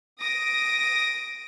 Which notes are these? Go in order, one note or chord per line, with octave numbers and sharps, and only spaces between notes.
D#6 A#6 D7